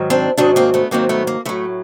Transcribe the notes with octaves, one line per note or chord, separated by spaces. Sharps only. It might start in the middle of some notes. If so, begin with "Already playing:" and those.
Already playing: G#2 D#3 F#3
C4 D4
G#2 D#3 F#3 C4 D4
A#3 C4
A3 B3
G#2 D#3 F#3 A#3 C4
A3 B3
A#3
A2 F#3 A3